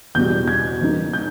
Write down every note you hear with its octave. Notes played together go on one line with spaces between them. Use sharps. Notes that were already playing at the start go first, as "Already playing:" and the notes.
E2 B2 G3 G6
G#6
C#3 E3 G3 A#3 D#4
G6